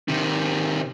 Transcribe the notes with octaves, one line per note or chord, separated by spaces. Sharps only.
C3 D#3